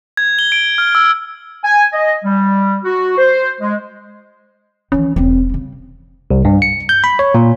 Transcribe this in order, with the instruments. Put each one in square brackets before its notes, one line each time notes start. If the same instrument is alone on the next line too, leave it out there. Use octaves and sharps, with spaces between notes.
[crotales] G#6
G7
D7
F6
E6
[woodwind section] G#5
D#5
G3
F#4
C5
G#3
[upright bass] D#3 E3 [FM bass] C#4
[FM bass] E1 [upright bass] C#3 C4
[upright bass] C#3 G3
[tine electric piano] C2
G2
C#7
G6
B5
C#5
A#2